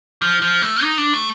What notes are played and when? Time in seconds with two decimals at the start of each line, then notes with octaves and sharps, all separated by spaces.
0.22 F3
0.42 F3
0.62 A3
0.83 D#4
0.98 D4
1.13 A3